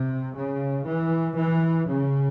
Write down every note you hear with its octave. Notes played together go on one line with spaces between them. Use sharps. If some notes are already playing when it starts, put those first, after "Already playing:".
Already playing: C3
C#3
E3
E3
C#3